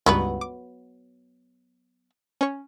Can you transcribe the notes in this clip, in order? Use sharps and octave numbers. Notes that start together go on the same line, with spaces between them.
C#2 G2 F#3 B3 B4
D6
C#4 C#5